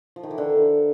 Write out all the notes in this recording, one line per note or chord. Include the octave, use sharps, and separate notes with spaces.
F3
D#3
E3
D3